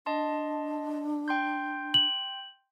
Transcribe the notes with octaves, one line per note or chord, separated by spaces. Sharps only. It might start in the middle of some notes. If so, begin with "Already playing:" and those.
D4 D#5 A5 C6
G5 C6 G6
F#7